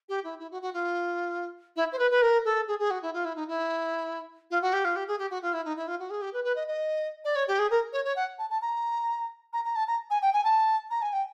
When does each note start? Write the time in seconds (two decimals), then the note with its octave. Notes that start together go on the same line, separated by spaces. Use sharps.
0.09 G4
0.24 E4
0.39 E4
0.51 F#4
0.62 F#4
0.74 F4
1.76 E4
1.92 C5
1.99 B4
2.11 B4
2.22 A#4
2.45 A4
2.68 G#4
2.79 G#4
2.91 F#4
3.02 E4
3.14 F4
3.25 E4
3.36 D#4
3.48 E4
4.51 F4
4.62 F#4
4.73 G4
4.85 F4
4.96 G4
5.08 G#4
5.19 G4
5.31 F#4
5.42 F4
5.53 E4
5.65 D#4
5.76 E4
5.88 F4
6.00 F#4
6.10 G#4
6.22 G4
6.33 B4
6.44 B4
6.56 D#5
6.68 D#5
7.25 D5
7.36 C#5
7.48 G4
7.59 G#4
7.71 A#4
7.93 C#5
8.05 C#5
8.16 F#5
8.39 A5
8.50 A5
8.62 A#5
9.53 A#5
9.65 A#5
9.76 A5
9.88 A#5
10.10 G#5
10.22 G5
10.33 G#5
10.44 A5
10.91 A#5
11.02 G#5
11.13 G5